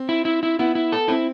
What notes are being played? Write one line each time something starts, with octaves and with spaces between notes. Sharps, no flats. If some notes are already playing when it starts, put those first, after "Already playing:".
Already playing: C4
E4
E4
E4
B3 E4
E4
A4
C4 E4